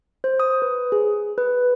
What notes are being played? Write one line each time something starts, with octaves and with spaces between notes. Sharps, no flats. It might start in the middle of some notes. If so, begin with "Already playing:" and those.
C5
D#6
B4
G#4
B4